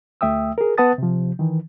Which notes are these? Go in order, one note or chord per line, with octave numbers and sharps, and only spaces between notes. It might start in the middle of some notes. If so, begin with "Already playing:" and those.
D2 A3 E5 G5 D#6 E6
G#4 A#4
B3 B4 F#5 A5 D#6 A6
C3 F3
D#3 E3